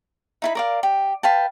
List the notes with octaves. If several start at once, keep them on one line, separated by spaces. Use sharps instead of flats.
D#4 E4 B5
A#4 D5 F5
G4
B4 F5 G5 A5